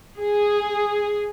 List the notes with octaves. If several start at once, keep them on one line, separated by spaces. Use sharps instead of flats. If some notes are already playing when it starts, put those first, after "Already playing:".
G#4